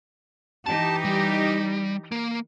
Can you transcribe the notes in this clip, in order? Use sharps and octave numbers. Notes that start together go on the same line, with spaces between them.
E3 D#4 G4 A5
G3
A#3